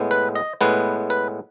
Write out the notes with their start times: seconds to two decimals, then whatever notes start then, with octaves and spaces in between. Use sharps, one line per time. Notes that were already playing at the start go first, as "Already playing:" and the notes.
Already playing: A2 G#3 B3
0.11 B4
0.35 D#5
0.61 A2 G#3 B3 B4
1.10 B4